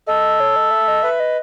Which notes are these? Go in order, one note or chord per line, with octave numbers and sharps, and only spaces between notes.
A4 D#5
C#5
D#5
E5
D#5
B4 E5
D#5